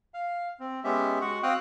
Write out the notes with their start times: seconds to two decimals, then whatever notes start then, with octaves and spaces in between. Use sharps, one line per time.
0.14 F5
0.60 C4
0.84 G#3 B3 C#4 G4 E5
1.21 G#3 F#4 F#5 C#6
1.43 C4 F#4 F5 G5 D#6 F#6